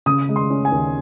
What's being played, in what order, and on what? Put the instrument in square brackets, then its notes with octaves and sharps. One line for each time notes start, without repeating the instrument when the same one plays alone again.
[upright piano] C#3 D#6
G#3
C6
C#4
G#5
D#2